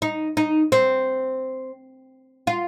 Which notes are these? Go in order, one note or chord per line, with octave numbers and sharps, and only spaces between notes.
D#4
D#4
C4
F4